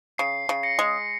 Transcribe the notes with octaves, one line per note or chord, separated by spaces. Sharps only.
C#3 C7
C#3
A#6 C#7
G#3